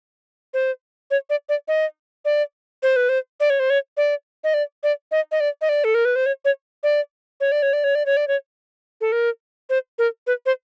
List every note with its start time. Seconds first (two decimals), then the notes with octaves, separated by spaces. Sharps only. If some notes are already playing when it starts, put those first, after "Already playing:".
0.54 C5
1.11 C#5
1.30 D5
1.49 D5
1.68 D#5
2.25 D5
2.83 C5
2.96 B4
3.09 C5
3.40 D5
3.50 C#5
3.60 C5
3.70 C#5
3.97 D5
4.44 D#5
4.54 D5
4.83 D5
5.12 D#5
5.32 D#5
5.40 D5
5.61 D#5
5.69 D5
5.84 A4
5.95 A#4
6.05 B4
6.16 C5
6.26 C#5
6.45 C#5
6.83 D5
7.41 C#5
7.52 D5
7.63 C#5
7.73 D5
7.84 C#5
7.95 D5
8.06 C#5
8.17 D5
8.28 C#5
9.01 A4
9.12 A#4
9.70 C5
9.99 A#4
10.27 B4
10.46 C5